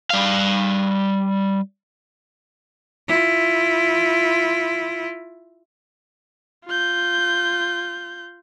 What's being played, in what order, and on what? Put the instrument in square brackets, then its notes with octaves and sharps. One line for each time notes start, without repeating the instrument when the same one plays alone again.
[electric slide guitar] G3 F5
[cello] E4 F4
[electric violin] F4 G6